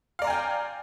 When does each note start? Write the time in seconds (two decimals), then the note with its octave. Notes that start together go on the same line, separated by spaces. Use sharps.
0.19 F5
0.22 D5
0.24 A#5
0.27 G#5
0.30 G5